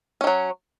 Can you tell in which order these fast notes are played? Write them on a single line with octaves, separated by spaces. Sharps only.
C#4 D#3 F#3